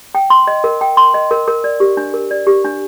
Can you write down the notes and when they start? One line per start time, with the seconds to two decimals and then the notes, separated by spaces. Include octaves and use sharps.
0.15 G5
0.30 C6
0.47 D#5
0.64 A#4
0.81 G5
0.97 C6
1.14 D#5
1.31 A#4
1.48 A#4
1.64 D5
1.80 G4
1.97 D4
2.14 A#4
2.31 D5
2.47 G4
2.64 D4